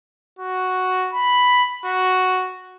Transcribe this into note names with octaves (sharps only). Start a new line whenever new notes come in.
F#4
B5
F#4